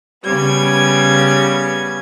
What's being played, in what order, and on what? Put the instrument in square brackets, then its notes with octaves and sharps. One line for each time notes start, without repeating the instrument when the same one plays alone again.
[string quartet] C#3 G3 B3 G#6